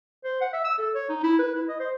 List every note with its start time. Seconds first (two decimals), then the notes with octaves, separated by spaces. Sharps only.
0.24 C5
0.41 F#5
0.53 E5
0.65 E6
0.78 A4
0.95 C#5
1.09 D#4
1.23 E4
1.39 B4
1.56 E4
1.68 D#5
1.80 C5